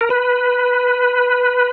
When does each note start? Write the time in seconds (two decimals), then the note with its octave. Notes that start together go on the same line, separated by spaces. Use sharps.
0.01 A#4
0.10 B4